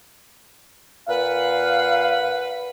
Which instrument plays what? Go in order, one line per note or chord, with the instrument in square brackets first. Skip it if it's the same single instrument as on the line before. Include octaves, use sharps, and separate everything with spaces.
[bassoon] A#2 [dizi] B4 [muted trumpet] F5 [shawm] F#5